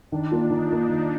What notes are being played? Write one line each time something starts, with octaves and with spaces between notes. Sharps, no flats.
D#3 D4
A#3 F4
D#3 D#4
A#3 F4
D#3